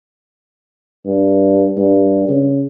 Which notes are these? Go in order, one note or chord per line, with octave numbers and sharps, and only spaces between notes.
G2
G2
C#3